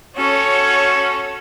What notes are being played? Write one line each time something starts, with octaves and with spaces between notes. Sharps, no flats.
C#4 F#4 A4 C#5